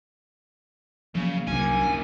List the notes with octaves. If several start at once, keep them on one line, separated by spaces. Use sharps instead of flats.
C#3 F3 F#3 A#3
C2 F#3 A#3 C#4 D4 G#5